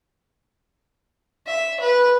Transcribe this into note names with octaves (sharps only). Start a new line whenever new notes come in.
E5
B4